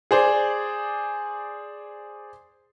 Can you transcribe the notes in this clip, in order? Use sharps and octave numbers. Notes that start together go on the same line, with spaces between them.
G#4 C5 D5